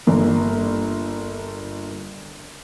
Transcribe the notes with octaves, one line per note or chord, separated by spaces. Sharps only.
G1 A#3